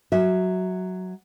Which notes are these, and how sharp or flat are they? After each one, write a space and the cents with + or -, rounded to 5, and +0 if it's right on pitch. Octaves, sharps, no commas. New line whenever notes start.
F#3 +0 E5 -20